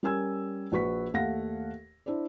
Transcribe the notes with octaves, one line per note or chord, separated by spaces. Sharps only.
G3 C#4 A#4 G#5 E6 G#6
A#1 F#4 B4 C#6 B6
D#2 A3 F5 F#5 A#6
D4 E4 C5 D5